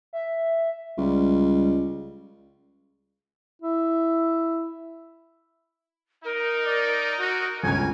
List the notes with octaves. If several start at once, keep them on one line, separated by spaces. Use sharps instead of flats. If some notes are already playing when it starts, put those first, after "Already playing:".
E5
C#2 G3
E4
D#4 A#4
D5
F#4
G1 C#2 C#4 G#5 G#6